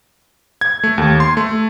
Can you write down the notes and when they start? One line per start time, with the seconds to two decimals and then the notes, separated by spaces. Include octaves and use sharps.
0.61 G#6
0.83 A3
0.98 D#2
1.20 C6
1.37 A3